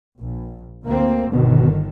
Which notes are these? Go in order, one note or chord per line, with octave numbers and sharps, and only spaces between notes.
A#1
D2 A#3 C4
G1 B2 D3 D#3